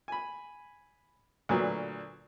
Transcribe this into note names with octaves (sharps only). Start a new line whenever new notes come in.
G#5 B5
D2 A#2 F#3 B4